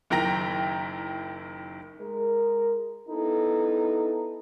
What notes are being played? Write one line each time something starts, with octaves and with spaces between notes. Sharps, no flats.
F#1 D#3 E4 G5 A#5 A#6
G#3 A#4
B3 D#4 E4 A4